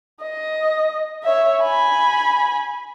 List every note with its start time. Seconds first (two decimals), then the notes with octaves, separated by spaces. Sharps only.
0.22 D#5
1.24 C#5 E5
1.62 G#5 B5